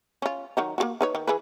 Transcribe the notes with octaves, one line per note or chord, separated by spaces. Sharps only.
C#4 F4
D#3 F#3 D#4
A#3 F4 F#4
D#4 B4 C#5
D#3
E3 G#4 B4